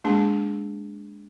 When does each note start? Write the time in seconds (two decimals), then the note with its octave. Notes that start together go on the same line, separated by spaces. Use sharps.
0.04 G#3 A#3 D4 G#4 A5